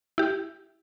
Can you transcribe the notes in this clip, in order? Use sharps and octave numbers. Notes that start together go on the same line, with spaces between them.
E4 G4